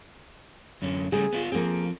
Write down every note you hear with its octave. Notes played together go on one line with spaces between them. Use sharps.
F#2 D3 C#4
C#3 G3 A3 G#4
B3 E4 F4
F3 A#3 C4 G#4